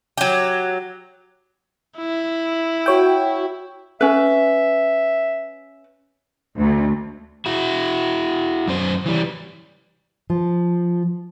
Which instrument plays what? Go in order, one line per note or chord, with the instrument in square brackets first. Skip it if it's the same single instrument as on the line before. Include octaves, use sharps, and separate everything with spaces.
[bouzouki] F#3 G4
[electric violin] E4
[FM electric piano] F#4 C#5 G5
[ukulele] C#4 B4 [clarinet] E5
[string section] D2
[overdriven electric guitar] E4 F#4
F#2 C5
E3 G3
[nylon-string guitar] F3